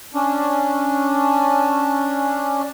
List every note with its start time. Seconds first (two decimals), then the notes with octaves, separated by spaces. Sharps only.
0.14 C#4 D4